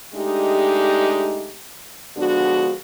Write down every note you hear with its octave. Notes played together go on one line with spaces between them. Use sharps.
G#3 A3 D4 D#4 G4
D3 F3 G#3 B3 D4 F#4